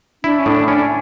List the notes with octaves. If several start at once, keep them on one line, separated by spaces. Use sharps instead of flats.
D4 E4
C#4
A2 D4
C#4 D4